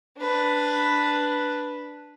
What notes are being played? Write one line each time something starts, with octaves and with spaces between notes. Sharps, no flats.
D4 B4